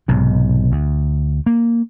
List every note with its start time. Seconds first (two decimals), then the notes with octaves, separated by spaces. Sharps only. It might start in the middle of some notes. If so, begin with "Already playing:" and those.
0.08 B1 G#2 C3
0.72 D2
1.46 A#3